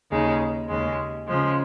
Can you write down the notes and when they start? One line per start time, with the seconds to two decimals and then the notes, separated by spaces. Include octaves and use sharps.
0.11 D#2 C#3 G#3 D#4
0.68 D#2 C#3 G#3
1.27 C#3 F3 G#3